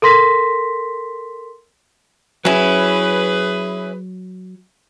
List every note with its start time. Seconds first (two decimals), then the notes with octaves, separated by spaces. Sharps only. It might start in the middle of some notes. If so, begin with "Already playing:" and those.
0.02 A4 A#4 C6 A#6 B6
2.45 F#3 C#4 E4 G#4 B4